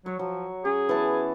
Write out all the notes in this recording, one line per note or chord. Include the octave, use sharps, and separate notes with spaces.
F#3 C#5
F3 F#3
C#4 G#4
E3 B3 A5